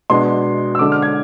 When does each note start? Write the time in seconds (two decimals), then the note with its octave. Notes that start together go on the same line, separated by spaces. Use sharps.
0.10 B2 G#3 D4 C6
0.75 E6
0.79 D3 G#3 D4 D6
0.92 F6
1.02 G#6